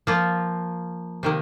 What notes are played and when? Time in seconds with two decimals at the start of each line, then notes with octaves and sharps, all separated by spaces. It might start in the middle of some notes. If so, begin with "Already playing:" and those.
0.07 F3 A#3 F4
1.23 C3 D#3 A#3